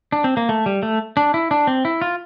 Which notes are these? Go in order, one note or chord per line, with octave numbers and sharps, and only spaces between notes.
D4
C4
A#3
A3
G3
A3
D4
E4
D4
C4
E4
F4